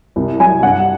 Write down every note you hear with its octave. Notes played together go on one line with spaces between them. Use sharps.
C2
F#3 G#5
G2 F#5